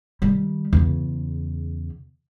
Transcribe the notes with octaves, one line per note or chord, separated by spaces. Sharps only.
D#3 G3
E2 C#3